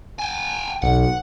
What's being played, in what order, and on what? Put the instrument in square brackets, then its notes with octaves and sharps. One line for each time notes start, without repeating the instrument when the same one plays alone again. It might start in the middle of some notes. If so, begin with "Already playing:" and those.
[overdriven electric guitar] G5 G#5
[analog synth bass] B1 [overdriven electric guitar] F#5